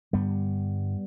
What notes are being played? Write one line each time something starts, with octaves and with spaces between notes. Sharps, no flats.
G2 D3 G3 B3